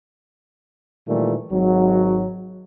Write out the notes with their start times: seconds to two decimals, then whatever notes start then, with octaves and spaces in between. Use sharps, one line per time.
1.08 A#2 D#3 E3 G3 A3
1.51 G#1 F#3